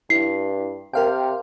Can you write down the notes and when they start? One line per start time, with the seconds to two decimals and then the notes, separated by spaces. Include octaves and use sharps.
0.10 G2 E4 C7
0.93 C3 A#4 F5 G5